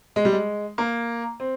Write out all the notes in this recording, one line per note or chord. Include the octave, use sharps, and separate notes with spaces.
G#3
G3
G#3
A#3
C4